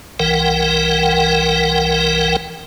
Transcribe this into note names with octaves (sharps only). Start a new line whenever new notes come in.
C2 E3 A#4 F#5 G5